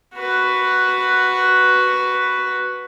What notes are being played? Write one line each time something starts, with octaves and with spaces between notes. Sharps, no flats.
F#4 B4